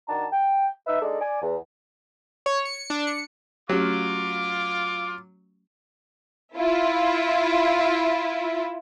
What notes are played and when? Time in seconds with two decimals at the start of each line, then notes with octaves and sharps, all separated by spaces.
0.08 D#3 D4 F#4 A5 A#5
0.32 G5
0.87 D#4 B4 E5
1.01 G#3 D4 D#4 A4 D5
1.21 D5 G#5
1.41 E2
2.46 C#5
2.65 C#7
2.90 D4
3.07 C#7
3.69 F#3 A3 C#4 F4 G4 D6
6.56 E4 F4